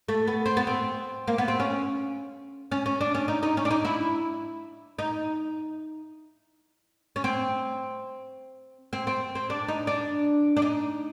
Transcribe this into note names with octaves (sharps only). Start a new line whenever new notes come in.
A3
B3
C4
B3
C4
A#3
B3
C4
C#4
C#4
C#4
D4
C#4
D#4
D#4
C#4
D4
D#4
E4
D#4
C#4
C4
C4
C4
C4
D4
D#4
D4
D4
D#4